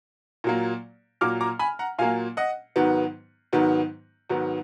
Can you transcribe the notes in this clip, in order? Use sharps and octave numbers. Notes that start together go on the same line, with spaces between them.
A#2 F#3 A#3
A#2 F#3 A#3 D6 F6
A#5 D6
G#5 B5
F#5 A#5
A#2 F#3 A#3 F5 G#5
D#5 F#5
G#2 D#3 F#3 B3
G#2 D#3 F#3 B3
G#2 D#3 F#3 B3